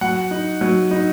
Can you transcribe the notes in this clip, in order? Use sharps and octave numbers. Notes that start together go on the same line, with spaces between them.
F#3 F#5
D#4
F#3
D#4